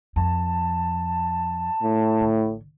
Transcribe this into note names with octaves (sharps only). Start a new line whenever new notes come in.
F2 A5
A2
A1 D3